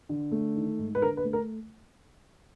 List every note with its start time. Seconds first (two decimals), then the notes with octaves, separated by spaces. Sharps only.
0.09 D3
0.31 A3
0.56 D#3
0.79 G#2
0.95 B4
1.02 D3 A#4
1.17 B4
1.24 A3
1.33 A#4